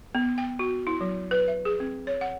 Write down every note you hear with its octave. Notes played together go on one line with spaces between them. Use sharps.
B3
G5
F#4
E4
F#3
B4
E5
G#4
C4
C#5
F#5